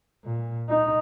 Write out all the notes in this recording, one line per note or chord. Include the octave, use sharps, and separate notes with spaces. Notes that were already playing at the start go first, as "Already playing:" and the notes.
A#2
D#4